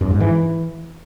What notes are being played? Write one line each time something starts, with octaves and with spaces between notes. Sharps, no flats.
F#2
G#2
E3